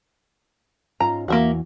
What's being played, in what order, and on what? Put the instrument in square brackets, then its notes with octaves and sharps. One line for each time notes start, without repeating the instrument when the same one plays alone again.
[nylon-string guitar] G#2 C#4 F4 [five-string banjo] A#5
[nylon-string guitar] E2 E3 F#4 [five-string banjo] A#3 E5 F#5